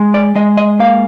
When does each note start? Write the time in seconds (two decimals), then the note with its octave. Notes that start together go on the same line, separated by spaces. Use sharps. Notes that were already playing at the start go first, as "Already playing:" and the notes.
Already playing: G#3
0.14 D5
0.35 G#3 D#5
0.57 D#5
0.79 A#3 F5